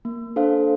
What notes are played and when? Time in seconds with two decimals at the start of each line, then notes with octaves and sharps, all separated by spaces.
0.05 A#3
0.36 D4 A4 C5 F5